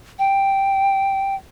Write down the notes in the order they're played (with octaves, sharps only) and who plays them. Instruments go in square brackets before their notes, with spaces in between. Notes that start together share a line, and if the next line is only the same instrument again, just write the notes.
[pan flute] G5